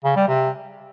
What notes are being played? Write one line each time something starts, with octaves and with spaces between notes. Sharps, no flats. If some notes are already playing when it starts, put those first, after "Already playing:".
C#3
G3
C3